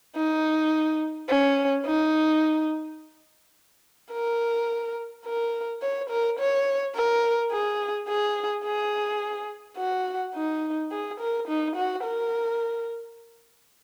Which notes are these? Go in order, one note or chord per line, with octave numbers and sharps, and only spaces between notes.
D#4
C#4
D#4
A#4
A#4
C#5
A#4
C#5
A#4
G#4
G#4
G#4
F#4
D#4
G#4
A#4
D#4
F#4
A#4